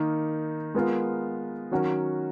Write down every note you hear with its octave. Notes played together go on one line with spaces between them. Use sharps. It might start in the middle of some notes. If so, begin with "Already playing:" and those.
Already playing: D#3 A#3 D#4
G#3 B3 F4 A#4
D#3 F#3 C#4 F#4 A#4